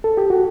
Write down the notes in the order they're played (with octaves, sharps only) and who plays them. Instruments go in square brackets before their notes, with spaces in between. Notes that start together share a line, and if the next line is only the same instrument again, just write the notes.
[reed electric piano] A4
G4
F#4